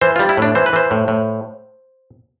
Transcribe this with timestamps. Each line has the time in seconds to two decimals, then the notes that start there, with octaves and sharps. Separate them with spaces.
0.01 E3 C5
0.16 G3 F4
0.29 E4
0.37 A2 D4
0.55 E3 C5
0.66 B4
0.73 E3 C5
0.91 A2
1.08 A2